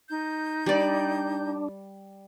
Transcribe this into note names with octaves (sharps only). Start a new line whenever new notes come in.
D#4 G6
G3 D4 D5